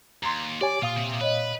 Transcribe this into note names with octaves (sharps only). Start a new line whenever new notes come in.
D#2 A#5 C6
G4 C#5 D5 G#5
A#2 F4 F5 D#6
C3
B4 C#5 D#5